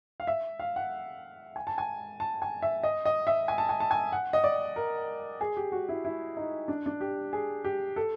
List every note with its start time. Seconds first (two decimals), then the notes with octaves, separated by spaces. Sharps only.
0.20 F5
0.27 E5
0.59 F5
0.76 F#5
1.56 G#5
1.67 A5
1.78 G#5
2.20 A5
2.42 G#5
2.62 E5
2.83 D#5
3.05 D#5
3.27 E5
3.48 G#5
3.58 A5
3.69 G#5
3.80 A5
3.91 G#5
4.12 F#5
4.33 D#5
4.44 D5
4.76 A#4
5.41 G#4
5.57 G4
5.72 F#4
5.89 E4
6.05 E4
6.37 D#4
6.68 D4
6.86 D4
7.01 G4
7.33 G#4
7.64 G4
7.96 A4